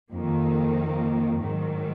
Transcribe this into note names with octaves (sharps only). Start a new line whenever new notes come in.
F2 D#3 A#3
G#2 D#3 F#3